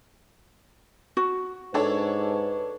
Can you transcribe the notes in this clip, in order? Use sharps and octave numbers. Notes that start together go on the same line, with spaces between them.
F#4
G#2 D4 A4 B4 C#5